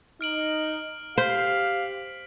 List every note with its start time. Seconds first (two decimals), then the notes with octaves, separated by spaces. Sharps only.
0.21 D#4 F6 D7 F#7
1.18 G4 C5 F5 B6